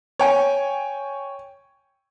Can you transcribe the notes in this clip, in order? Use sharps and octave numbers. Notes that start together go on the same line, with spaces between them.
C#5 G5 G#5